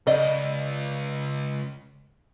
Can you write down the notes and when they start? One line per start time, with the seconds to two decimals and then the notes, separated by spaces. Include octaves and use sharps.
0.07 C#2 D5 D#5